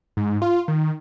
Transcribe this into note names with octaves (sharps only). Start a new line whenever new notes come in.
G#2
F4
D#3